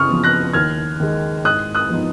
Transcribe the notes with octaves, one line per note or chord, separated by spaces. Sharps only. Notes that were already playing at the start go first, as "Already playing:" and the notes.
Already playing: C#3 C#6 D#6 F6
F3 B3
F#6 A#6
D#2 F6 G#6
D#3 G#3
G#2 D#6 F#6
D#6 F#6
F3 B3 D#4